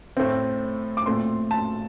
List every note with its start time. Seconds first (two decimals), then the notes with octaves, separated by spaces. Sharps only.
0.17 A2 A3 C4
0.97 D6
1.06 A#2 A3 C4 C6
1.51 A5